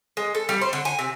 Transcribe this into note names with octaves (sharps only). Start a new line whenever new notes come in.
G#3
A4
G3
C5
D3
G#5
C3